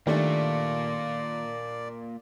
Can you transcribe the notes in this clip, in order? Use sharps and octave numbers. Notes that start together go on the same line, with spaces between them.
D#3 G3 A3 A#3 D4 F4 D5